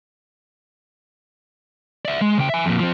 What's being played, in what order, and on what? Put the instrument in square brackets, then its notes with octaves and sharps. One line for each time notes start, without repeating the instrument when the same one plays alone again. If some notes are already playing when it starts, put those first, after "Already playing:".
[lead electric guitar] D5 E5
G#3
C#3 G5
E5 G#5
F2 A#2
F3 C4